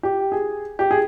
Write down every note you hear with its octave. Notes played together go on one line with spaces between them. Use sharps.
G4
G#4
G4
G#4